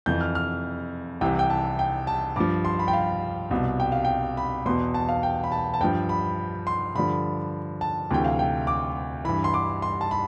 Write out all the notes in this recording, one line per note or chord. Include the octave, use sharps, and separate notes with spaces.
F2 E3 G6
F6
F6
C2 C3 E3 G5
G5
A5
G5
A5
G2 F3 D6
C6
B5
G5
F5
C2 B2
G5
F5
G5
B5
E2 B2 C6
A5
F5
G5
B5
A5
A5
G2 F3 G5
B5
C6
G2 D3 F3 B5
A5
D2 C3 E3 G5
F5
G5
D6
G2 E3 B5
C6
D6
C6
A5
B5